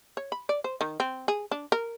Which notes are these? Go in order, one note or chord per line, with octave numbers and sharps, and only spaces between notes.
C#5
B5
D5
C5
D#3
C4
G#4
D4
A#4